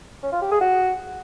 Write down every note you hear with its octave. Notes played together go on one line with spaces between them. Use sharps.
C#4
F4
G4
G#4
F#4